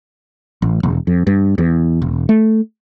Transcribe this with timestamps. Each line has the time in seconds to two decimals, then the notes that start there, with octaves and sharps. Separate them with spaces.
0.62 A1
0.83 E1
1.07 F2
1.27 G2
1.58 E2
2.02 E1
2.29 A3